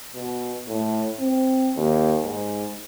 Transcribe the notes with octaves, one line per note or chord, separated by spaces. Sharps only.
B2
A2
C4
D#2
G#2